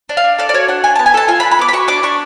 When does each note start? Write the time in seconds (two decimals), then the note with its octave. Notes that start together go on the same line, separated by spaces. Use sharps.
0.09 D4
0.17 F5
0.24 D4
0.39 A4 D5
0.49 D5
0.54 F#4 C#5
0.68 D4 F#5
0.84 D4 G#5
0.96 A5
0.99 B3
1.06 G#5
1.14 A4 A5
1.28 F4 G#5
1.40 B5
1.43 D4
1.51 B5
1.59 B3 D6
1.69 B5
1.73 F#4 C#6
1.88 D4 D6
2.03 D4 C#6